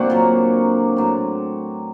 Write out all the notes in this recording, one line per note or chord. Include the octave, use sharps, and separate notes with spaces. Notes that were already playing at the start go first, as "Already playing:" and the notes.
Already playing: D3 A#3 C4 D4 F#4
A#2 F#3
A2 F#3